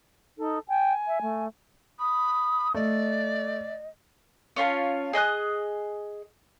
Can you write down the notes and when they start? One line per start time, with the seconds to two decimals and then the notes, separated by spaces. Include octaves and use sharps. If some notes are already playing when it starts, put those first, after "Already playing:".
0.38 D#4 A4
0.68 G5 G#5
1.07 E5
1.22 A3
1.99 B5 D#6
2.74 A3 D5 D#5
4.56 C#4 F4 C#5 A5
5.13 G#4 D#5 D#6 F#6